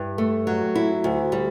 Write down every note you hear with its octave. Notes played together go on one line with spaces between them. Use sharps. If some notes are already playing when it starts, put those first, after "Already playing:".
Already playing: G2 E4
A3
F#3
E4
D2
G3